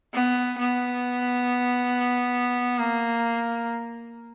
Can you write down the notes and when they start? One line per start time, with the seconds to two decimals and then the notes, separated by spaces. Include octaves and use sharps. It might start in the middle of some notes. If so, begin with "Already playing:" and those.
0.14 B3
0.58 B3
2.78 A#3